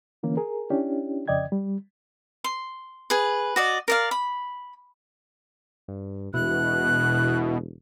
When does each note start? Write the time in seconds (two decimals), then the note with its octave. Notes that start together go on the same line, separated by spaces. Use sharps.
0.23 D3 E3 A#3 C#4
0.37 G#4 A#4
0.70 C#4 D4 E4 G4
1.28 F2 C#3 D5 D#5 G5 G#6
1.52 G3
2.44 C6
3.10 G#4 B4
3.56 F#4 D5 D#5
3.88 A#4 D5 F5
4.11 B5
5.88 G2
6.34 E1 B2 E4 F#6